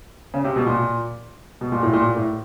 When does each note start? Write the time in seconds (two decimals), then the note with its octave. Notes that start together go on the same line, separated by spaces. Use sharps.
0.34 C#3
0.44 C3
0.56 B2
0.66 A#2
1.61 B2
1.72 A#2
1.83 A2
1.93 A#2
2.16 A2